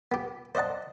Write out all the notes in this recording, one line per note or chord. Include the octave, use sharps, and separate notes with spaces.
B3 G4
C5 D5 D#5 F#5 A5